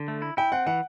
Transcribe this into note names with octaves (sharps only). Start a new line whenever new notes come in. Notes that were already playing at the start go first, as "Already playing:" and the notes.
Already playing: D3
A3
E4
E4 G5
C4 F#5
E3 F#5